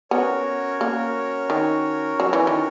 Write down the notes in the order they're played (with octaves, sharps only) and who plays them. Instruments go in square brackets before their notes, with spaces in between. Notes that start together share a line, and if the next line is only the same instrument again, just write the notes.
[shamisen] B3 [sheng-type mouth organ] C#4 F#4 A#4 C#5
[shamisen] A#3
D#3
F#3
E3
D#3